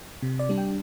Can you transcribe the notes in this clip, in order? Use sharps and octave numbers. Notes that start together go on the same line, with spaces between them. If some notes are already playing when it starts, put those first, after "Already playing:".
C3
D5
G3 D4
G5